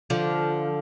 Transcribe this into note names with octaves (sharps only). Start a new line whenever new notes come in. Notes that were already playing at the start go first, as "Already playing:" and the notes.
D3 F3